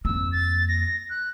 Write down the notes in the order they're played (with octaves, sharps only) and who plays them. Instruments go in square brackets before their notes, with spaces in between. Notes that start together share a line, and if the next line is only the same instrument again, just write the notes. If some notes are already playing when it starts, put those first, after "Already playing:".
[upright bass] F2 A#3 [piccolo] E6
[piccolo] A6
A#6
F#6